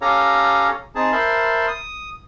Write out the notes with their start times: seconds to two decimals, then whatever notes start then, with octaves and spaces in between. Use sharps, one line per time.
0.02 C#4 G4 A4 C#5 F5 A#5
0.95 C4 D#4 G#4 A5
1.12 A#4 C5 E5 A5 B5 C6
1.68 D#6